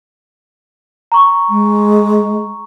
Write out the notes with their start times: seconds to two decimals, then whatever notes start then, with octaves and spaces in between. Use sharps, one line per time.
1.12 A#5 C#6
1.49 G#3